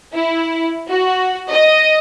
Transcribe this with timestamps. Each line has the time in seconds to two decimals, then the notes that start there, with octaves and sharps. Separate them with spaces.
0.12 E4
0.90 F#4
1.49 D#5